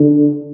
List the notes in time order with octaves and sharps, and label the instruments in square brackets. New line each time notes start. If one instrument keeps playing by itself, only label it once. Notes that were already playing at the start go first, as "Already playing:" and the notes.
Already playing: [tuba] D3